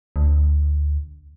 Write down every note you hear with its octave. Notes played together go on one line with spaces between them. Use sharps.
D2